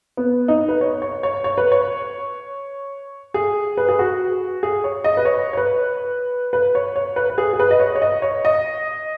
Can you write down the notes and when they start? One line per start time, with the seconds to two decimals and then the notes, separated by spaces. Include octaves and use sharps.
0.17 B3
0.48 D#4
0.69 B4
0.81 C#5
1.02 C#5
1.23 C#5
1.44 C#5
1.58 B4
1.72 C#5
3.34 G#4
3.77 B4
3.89 G#4
3.99 F#4
4.63 G#4
4.84 C#5
5.04 D#5
5.17 B4
5.25 C#5
5.53 C#5
5.57 B4
6.53 B4
6.75 C#5
6.96 C#5
7.16 B4
7.30 B4
7.38 G#4
7.53 G#4
7.60 B4
7.71 D#5
7.80 C#5
7.95 C#5
8.02 D#5
8.22 C#5
8.45 D#5